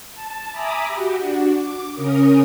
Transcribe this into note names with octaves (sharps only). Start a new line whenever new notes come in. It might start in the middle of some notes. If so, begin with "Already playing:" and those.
A5
E5 G#5 A#5 B5 D6 D#6
F#4 G4
D4 F#4
D6
C#3 C#4 A#4 D#6